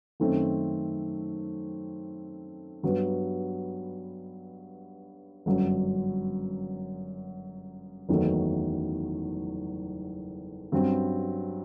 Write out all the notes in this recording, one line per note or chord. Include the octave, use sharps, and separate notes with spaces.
F#2 D#3 A3 C4
G2 F#3 B3
G1 F#2 F#3
F#1 E2 D#3 F#3 A3
G2 F#3 C4